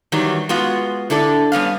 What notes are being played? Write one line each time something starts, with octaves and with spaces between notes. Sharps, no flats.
D#3 E3 F#3 G3
G#3 B3 F4 F#4
D3 E4 A4 D5
G3 B3 C#4 F5